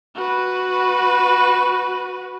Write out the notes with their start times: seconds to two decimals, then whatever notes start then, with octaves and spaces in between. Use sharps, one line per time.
0.15 F#4 B4